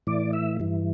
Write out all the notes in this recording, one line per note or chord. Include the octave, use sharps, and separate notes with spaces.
A2 E3 D5
E5
G2 E3